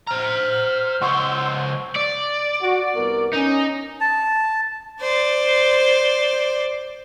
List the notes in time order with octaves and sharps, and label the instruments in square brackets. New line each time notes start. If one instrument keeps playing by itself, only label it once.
[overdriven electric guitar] C5 A#5 [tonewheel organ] F6
[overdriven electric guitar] C#2 C5 [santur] C#5 D#5 C#6 [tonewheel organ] F#5 C6 E6
[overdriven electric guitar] D5
[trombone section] F#4
C2 B3 A#4
[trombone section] C#4 [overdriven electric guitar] D#4
[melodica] A5
[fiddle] C5 D5